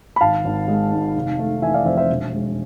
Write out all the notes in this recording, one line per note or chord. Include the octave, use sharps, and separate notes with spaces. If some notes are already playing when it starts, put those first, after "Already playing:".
B5
G#1 F5 A5
G#1
G#3
G#2
F1
A3
E3 E5 G#5
D5 F5
F2 C5 E5
C5 E5
E1
G#3